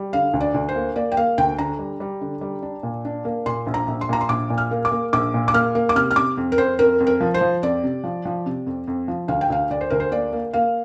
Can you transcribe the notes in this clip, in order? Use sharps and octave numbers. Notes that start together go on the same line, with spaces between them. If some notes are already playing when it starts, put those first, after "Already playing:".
Already playing: G3
D3 F5
D2
D5
D2
C5
A#3
A#3 D5
G5
A#3 F5
D2 G5
D3 A#5
G3
G3
D3
G3
D4
A#2
D4
A#3
A#2 C6
A#1
A#5
A#1
C6
A#2 A#5
C6
A#1 D6
A#2
F6
A#3
D6
A#3
A#1 D6
A#2
D6
A#3 F6
A#3
D6
C3 F6
F6
C3 D6
F2
A#4
F2 C5
F2 A#4
F2
A#4
F3
C5
F3
F2 D5
C3
F3
F3
C3
F2
F2
F3
D2 F5
G5
D2 F5
D2 D5
C5
D2 A#4
C5
A#3 D5
A#3
A#3 F5